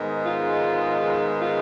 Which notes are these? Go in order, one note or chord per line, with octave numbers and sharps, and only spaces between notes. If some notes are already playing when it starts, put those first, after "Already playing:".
Already playing: G#2 D#3 G#3 B3
F4
F4